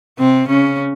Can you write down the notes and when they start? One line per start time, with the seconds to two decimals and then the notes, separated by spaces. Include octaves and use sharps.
0.19 C3 C4
0.48 C#3 C#4